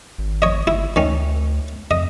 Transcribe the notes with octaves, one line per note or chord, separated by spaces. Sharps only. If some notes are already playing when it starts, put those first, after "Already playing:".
G#1
C#5 D#5
G1 E4
D2 D#3 C#4
F2 D#5